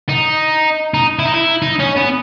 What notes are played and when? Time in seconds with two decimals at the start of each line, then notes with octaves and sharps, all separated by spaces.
0.09 D#4
0.94 D#4
1.19 E4
1.26 D#4
1.34 E4
1.62 D#4
1.80 C#4
1.97 B3